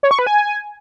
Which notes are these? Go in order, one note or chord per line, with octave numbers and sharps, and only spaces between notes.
C#5
C#6
B4
G#5